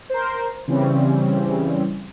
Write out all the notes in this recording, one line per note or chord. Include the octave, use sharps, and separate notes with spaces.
A#4 C5
C#3 E3 G3 C4 C#4